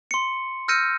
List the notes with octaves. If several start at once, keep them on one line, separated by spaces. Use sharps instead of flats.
C6 C#7
E6 F6 G6 A#6 C#7 D#7